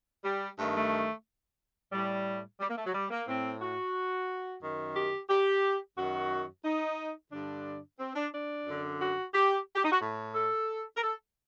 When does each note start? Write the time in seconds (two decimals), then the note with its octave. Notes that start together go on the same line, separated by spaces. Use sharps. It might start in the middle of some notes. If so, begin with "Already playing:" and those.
0.24 G3
0.57 G2 D#3 A3
0.75 A3
1.92 A2 G3
2.59 G3
2.68 A#3
2.76 A3
2.85 F#3
2.93 G3
3.10 A#3
3.27 A2 C4
3.61 F#4
4.61 F#2 D#3
4.95 G4
5.29 G4
5.96 F#2 D#3 F#4
6.64 D#4
7.31 G2 D3 D4
7.98 C4
8.15 D4
8.32 D4
8.65 F#2 D3
8.99 F#4
9.33 G4
9.75 G4
9.83 D#4
9.91 F#4
10.00 A2
10.34 A4
10.96 A#4
11.01 A4